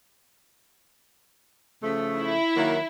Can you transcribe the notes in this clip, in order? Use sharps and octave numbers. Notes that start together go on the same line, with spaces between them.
C#3 F3 A3
E4
D#3 F#3 A#3